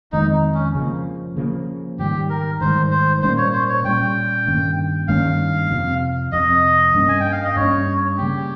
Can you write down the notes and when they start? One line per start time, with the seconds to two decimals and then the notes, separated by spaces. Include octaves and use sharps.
0.12 F2 D#3 G#3 C4 D#4
0.54 C#4
0.75 C#3 F3 A#3
1.36 C#3 F3 A#3
1.99 G#2 D#3 G3 G4
2.30 A#4
2.61 G#2 D#3 G3 C5
2.91 C5
3.22 A#2 G3 A#3 C#4 C5
3.37 C#5
3.53 C5
3.69 C#5
3.85 A#2 G3 A#3 C#4 G5
4.47 G2 D#3 A#3 C#4
5.08 G2 D#3 A#3 C#4 F5
5.71 F2 C3 F3 C4
6.32 F2 C3 F3 C4 D#5
6.94 G2 G3 A#3 C#4
7.09 G#5
7.20 G5
7.32 F5
7.44 D#5
7.56 G2 G3 A#3 C#4 C#5
8.18 C#3 G3 A#3 G4